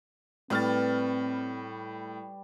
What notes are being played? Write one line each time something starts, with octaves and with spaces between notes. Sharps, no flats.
A2 G3 C4 B4 F6 A6